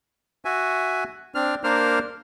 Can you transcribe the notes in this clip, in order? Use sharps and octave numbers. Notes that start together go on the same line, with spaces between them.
F#4 E5 G#5
C4 D4 F6
A#3 D4 A#4 C5 F6